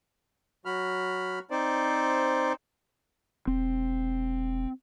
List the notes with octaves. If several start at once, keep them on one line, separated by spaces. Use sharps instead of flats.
F#3 F#4 B5 F6
C4 D#4 C5 D5
E1 C4